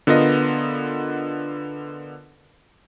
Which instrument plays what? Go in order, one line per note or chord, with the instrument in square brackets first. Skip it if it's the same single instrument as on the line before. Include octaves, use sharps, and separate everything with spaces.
[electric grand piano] D3 B3 F4 A#4 D#5